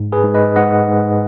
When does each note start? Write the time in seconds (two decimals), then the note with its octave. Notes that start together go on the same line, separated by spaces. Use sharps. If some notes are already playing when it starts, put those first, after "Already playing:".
Already playing: G#2
0.12 G#4 B4
0.24 G#2
0.34 B4 D#5
0.56 G#2 D#5 F#5
0.89 G#2